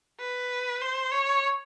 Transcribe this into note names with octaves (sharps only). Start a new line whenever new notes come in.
B4
C5
C#5